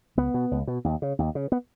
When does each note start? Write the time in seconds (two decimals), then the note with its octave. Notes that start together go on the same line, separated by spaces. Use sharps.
0.17 C#2 B3
0.34 B2
0.51 C#2
0.67 B2
0.84 D#2
1.02 C#3
1.19 D#2
1.35 C#3
1.52 B3